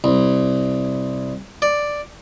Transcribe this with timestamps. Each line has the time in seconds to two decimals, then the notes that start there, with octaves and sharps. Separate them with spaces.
0.04 C2
1.62 D5